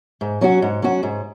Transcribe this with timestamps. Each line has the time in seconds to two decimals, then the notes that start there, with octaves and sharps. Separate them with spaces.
0.21 G#2
0.41 F#3 C#4 F#4
0.62 G#2
0.82 F#3 C#4 F#4
1.03 G#2